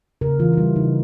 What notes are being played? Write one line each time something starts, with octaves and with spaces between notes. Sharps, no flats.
C#3 A#4
E3 F4
F4
G3 E4
C#3 D#4